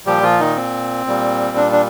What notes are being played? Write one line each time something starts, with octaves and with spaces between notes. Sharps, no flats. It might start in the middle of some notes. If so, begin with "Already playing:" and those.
A#2 F3 G3 G4
F3 F4
D#3 D#4
C4
A#2 G3
D4
D4